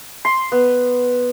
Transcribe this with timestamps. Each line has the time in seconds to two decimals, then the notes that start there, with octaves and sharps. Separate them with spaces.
0.25 C6
0.52 B3